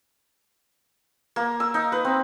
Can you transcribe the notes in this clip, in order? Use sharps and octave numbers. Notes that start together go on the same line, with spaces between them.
A#3
E6
D#4
B4
C4